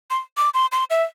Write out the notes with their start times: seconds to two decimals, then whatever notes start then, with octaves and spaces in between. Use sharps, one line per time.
0.10 C6
0.37 D6
0.54 C6
0.72 C6
0.90 E5